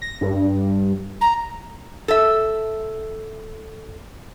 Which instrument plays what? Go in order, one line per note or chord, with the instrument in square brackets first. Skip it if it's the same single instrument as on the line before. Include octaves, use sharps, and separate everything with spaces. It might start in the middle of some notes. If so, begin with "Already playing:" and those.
[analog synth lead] A#6
G2
[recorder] A#5
[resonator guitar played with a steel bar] A4 E5